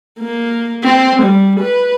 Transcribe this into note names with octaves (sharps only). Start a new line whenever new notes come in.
A#3
C4
G3
B4